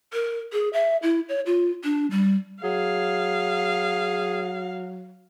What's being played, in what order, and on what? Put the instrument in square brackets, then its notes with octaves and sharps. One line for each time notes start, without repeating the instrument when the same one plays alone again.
[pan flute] A#4
G#4
E5
E4
C#5
F4
D4
G3
[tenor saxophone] F#3 [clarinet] G#4 [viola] F5